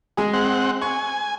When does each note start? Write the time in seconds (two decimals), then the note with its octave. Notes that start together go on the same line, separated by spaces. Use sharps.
0.17 G#3 G#4
0.33 C4 F#5
0.82 G#5 C#6